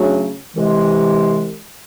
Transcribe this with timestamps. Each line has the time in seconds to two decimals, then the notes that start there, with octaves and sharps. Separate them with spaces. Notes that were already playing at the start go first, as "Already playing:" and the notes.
Already playing: C#3 F#3 A3 D4 F#4
0.54 C2 C3 E3 G#3